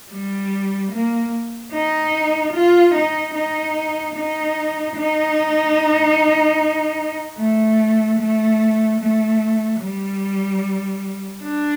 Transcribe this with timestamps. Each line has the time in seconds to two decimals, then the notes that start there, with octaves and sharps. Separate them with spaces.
0.11 G3
0.92 A#3
1.73 D#4
2.53 F4
2.94 D#4
3.34 D#4
4.16 D#4
4.96 D#4
7.38 A3
8.20 A3
9.00 A3
9.81 G3
11.43 D4